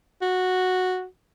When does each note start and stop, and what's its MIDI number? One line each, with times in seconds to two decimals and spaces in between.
0.22 1.05 66